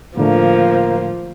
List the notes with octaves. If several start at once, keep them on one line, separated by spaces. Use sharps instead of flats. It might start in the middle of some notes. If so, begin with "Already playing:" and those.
A2 D3 F3 A3 A#3